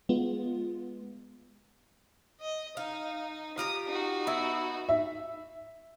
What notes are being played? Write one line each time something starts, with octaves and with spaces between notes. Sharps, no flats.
G#3 B3 F4
D#5
D#4 F5
F4 G4 A#5 D#6
D#4 F#4
B3 E4
E5